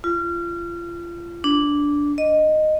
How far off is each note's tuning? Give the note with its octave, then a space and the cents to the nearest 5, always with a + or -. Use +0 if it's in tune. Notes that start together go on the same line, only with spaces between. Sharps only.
F4 -30
D4 -10
D#5 -10